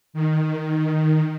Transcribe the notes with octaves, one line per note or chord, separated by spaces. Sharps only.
D#3